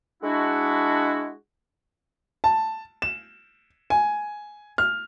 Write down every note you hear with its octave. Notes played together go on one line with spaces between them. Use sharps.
G#3 D4 E4 F#4
A5
E7
G#5
F6